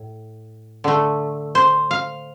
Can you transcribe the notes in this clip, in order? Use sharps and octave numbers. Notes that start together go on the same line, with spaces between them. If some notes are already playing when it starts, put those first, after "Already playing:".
Already playing: A2
D3 A3
C5
F5